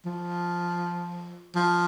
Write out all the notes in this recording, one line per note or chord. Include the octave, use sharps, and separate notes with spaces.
F3
F3